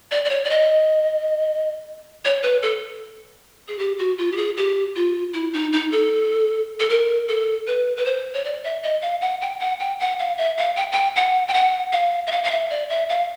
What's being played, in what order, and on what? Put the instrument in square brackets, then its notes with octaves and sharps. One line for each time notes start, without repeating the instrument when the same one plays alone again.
[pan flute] D5
D5
C#5
D5
D#5
C#5
B4
A4
G#4
G4
F#4
F4
G4
G#4
G4
F4
E4
D#4
D#4
A4
A4
A#4
A4
B4
B4
C5
C#5
D5
E5
D#5
F5
F#5
G5
F#5
G5
F#5
F5
E5
F5
G5
G5
F#5
G5
F#5
F5
E5
F5
F5
E5
D5
E5
F5